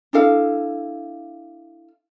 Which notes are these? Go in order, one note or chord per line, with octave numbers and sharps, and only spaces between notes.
D4 E4 A4 F5